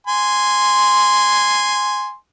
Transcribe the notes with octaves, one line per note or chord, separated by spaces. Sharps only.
G#5 C6